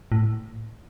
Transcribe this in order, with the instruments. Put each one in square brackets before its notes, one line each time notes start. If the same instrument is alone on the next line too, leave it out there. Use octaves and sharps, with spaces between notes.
[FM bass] A2